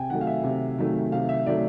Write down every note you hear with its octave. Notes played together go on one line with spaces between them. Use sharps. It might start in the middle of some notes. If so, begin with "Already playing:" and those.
Already playing: C3 G5 G#5
D#3 F#3 A3 F#5
F5
E5
C3
D#3 F#3 A3
C3 F5
E5
D#3 F#3 A3 D5